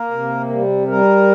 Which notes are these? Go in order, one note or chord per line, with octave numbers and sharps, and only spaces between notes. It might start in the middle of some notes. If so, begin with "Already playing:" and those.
Already playing: A#3 A#4
C3
G3
G3 A#4